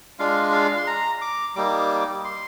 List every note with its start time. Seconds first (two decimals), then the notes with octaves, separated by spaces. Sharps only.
0.19 G#3 D4 F4 F5
0.52 F5
0.77 C6
0.87 A#5
1.21 D6
1.56 G3 A#3 D#4 D6
2.25 C6